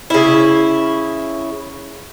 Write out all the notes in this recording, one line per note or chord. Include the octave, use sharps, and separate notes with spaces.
C#3 E4